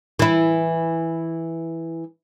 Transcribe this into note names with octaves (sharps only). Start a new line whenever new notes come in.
E3 E4